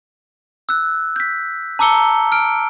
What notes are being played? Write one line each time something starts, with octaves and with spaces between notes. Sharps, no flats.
E6 F#6
G6 B6
A5 A#5 D6 E6 C#7 G7
F6 D7